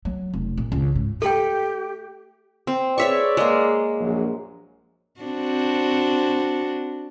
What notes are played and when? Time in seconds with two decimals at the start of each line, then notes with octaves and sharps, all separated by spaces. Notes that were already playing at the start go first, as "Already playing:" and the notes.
0.05 F#3
0.34 F1
0.58 A#2
0.72 C#2
0.95 G#2
1.22 A3 G4 A4 G5 B5
2.67 C4
2.98 G#4 B4 C#5 D5 E5 C#6
3.37 G#3 A#3
4.00 A#1 F#2
5.21 C4 D4 F#4